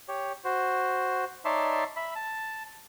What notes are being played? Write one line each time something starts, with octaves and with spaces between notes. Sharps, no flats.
G4 C#5
F#4 C5
D#4 C#5 D5 E5 A5 C6
E5 B5
A5